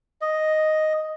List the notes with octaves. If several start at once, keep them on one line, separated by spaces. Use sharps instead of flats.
D#5